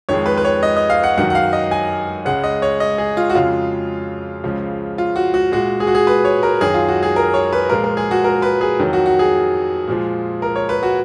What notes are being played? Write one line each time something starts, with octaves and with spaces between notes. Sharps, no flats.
F2 D#3 G#3 C#5
B4
B4
C#5
D#5
D#5
F5
F#5
F#2 D#3 F#3 F#5
F#5
F5
D#5
G#5
C#2 C#3 G#3 F#5
D#5
C#5
D#5
G#4
F4
F#4
F2 C#3 G#3 F4
C#2 C#3 F3
F4
F#4
F#4
A#2 G#3 F#4
G#4
F#4
G#4
B4
C#5
A#4
F#2 D#3 F#3 G#4
F4
F#4
G#4
A#4
C#5
B4
A#2 F3 G#3 A#4
A#4
G#4
F#4
A#4
B4
G#4
F2 D#3 F#3
F#4
F#4
G#4
A#2 F3 G#3
A#4
C#5
B4
F#4